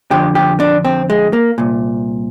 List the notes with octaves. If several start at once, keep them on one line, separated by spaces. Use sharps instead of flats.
F2 D3 G4
G4
D4
C4
G#3
A#3
C2 A#2